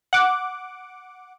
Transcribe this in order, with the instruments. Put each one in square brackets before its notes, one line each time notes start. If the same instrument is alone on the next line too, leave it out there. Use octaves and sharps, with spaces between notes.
[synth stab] F#5 D6